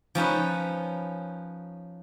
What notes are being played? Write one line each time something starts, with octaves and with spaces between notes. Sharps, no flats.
F3 C#4 D#4 B4